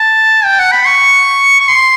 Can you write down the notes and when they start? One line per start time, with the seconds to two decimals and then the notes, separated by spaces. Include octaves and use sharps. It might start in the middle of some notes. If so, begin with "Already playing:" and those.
Already playing: A5
0.45 G5
0.59 F#5
0.72 B5
0.87 C#6
1.60 C#6
1.68 C6